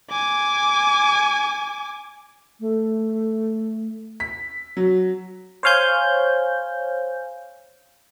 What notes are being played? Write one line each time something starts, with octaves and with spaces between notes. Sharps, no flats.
G#5 D6
A3
B6
F#3
C5 C#5 F5 G#5 G6